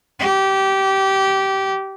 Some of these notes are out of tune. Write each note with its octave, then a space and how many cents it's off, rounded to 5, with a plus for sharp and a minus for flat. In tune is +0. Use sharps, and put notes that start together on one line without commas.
G4 -20